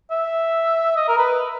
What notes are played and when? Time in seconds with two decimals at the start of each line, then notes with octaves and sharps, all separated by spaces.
0.11 E5
0.96 D#5
1.08 A#4
1.18 B4